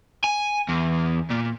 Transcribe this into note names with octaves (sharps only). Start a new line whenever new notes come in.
G#5
E2
A#2